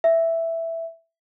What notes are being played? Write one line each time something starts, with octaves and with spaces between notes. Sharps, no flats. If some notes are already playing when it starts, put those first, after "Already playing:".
E5